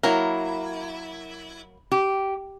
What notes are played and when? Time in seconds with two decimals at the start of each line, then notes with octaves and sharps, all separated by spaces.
0.03 F#3 A#3 E4 A#4
1.92 G4